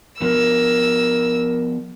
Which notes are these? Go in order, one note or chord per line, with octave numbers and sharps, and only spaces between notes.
F3 B3 F#4 A#4 E6